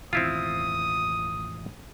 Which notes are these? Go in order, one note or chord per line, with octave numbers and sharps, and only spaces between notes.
E1 A1 D#3 C4 E4 F4 D#6